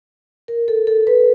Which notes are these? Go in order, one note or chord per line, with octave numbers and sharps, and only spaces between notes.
A#4
A4
A4
B4